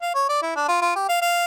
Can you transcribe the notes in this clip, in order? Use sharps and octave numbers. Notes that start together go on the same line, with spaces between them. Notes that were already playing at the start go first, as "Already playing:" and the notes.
F5
C#5
D5
E4
D4
F4
F4
G4
F5
F5